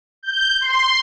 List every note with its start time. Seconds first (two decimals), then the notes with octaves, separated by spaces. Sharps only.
0.23 G6
0.61 C6